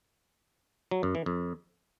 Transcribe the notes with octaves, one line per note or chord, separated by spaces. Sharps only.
F#3
F#2
E3
F2